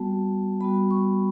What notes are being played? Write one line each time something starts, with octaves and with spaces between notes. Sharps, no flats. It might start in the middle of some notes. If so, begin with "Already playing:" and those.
Already playing: G3 B3 F#4 A5
G3 B3 F#4 B5
C#6